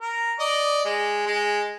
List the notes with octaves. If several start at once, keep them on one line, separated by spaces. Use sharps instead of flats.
A#4
D5 D#5
G#3
G#3